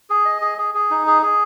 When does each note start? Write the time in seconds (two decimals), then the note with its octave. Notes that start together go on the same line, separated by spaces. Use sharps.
0.10 G#4
0.25 D#5
0.42 G#4
0.58 G#4
0.74 G#4
0.91 D#4
1.07 G#4
1.22 G#4